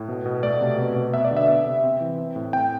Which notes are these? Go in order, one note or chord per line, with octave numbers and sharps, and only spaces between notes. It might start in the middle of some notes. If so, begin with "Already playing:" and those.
Already playing: A2
B2
B2
A3 D5
C3
B2
B2
B3 E5
D5
D3
E5
B3 E5
C3
C4
E3
C4
A2
C4 G5